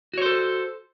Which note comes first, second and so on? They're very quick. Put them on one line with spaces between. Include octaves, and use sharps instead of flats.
F#4 C#5 C5 A4